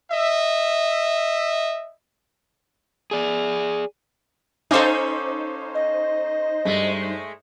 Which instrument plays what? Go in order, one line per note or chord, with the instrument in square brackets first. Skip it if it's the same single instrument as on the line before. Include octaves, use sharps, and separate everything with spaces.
[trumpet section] D#5 E5
[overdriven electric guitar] G#4 D5
[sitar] C#4 A4 [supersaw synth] D#4 C5 [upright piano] F5 G#5 D6
[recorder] D#5
[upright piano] G2 [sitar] G#3 A3